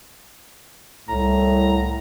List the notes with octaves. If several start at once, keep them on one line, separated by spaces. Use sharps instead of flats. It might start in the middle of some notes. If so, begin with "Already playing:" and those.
C2 A2 A#5